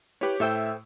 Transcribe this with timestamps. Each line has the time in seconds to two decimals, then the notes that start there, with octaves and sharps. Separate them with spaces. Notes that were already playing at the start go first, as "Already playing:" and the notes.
0.21 E4 G4 B4 C#5
0.40 A2 A4 C5 E5 G5 E6